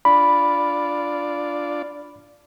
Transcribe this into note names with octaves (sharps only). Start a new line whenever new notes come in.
D4 F4 D5 B5